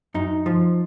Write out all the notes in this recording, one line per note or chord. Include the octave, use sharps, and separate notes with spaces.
F#2 D#4
F3